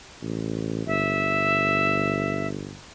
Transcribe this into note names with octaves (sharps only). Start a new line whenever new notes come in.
A1
G1 E5